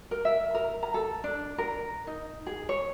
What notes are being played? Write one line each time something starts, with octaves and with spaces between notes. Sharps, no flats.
A#4
E5
A#4
A#5
A4
D4
A#4
D#4
G#4
C#5